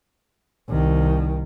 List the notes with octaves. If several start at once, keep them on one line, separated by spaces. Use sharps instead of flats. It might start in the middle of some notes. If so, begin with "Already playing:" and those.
C2 D#3